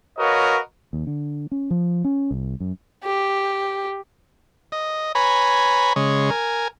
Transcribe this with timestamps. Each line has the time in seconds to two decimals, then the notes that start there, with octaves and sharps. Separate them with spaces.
0.18 F#4 A#4 B4 C#5 D#5 F5
0.93 D#2
1.07 D3
1.52 C#4
1.71 F3
2.04 C#4
2.31 C2
2.60 F#2
3.04 G4
4.72 D#5
5.15 B4 C#5 G#5 A#5 B5
5.96 C#3 G#3 C#5
6.30 A#4 G#5